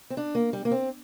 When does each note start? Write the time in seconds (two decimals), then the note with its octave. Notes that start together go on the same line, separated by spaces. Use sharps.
0.10 C4
0.17 D4
0.35 A#3
0.53 G3
0.65 A#3
0.71 C4